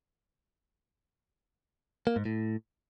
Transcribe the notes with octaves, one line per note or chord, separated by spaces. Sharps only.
A#3
G#2
A2